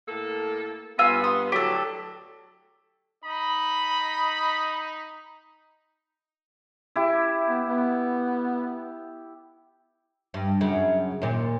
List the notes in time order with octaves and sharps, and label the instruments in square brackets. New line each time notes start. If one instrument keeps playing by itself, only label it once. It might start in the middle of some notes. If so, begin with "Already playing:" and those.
[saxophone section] A2 A#3 A4
[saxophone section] G2 B3 [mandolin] F4 G#5 E6
[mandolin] C6 D#6
[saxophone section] A2 D3 F#3 [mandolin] G4 A4
[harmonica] D#4 D#5 [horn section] B5
[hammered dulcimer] E4 G4
[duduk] B3
B3
[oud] G2
F#2 C#3
D#2 A#2